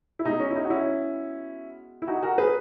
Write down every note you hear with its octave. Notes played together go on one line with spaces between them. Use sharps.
E4
B2 G#3 D#4
C#4
E4
D#4
F#4
C#4 E4
E4
D#4 F#4
F#4 A#4
G#4 B4